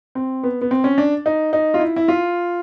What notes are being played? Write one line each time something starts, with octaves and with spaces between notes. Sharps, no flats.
C4
B3
B3
C4
C#4
D4
D#4
D#4
F4
E4
E4
F4